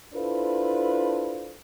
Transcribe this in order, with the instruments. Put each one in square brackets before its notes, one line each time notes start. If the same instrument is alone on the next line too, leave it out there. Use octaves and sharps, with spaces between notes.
[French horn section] D4 E4 F4 A4 B4 C5